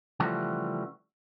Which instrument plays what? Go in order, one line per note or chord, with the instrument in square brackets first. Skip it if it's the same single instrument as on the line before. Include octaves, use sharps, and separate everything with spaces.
[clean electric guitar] C#3 E3 F3 G3 A3 F#4